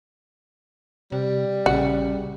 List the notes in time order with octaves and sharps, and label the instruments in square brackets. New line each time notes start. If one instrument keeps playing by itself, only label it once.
[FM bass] C3 [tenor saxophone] G3
[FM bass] A#1 [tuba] C#3 [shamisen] F#4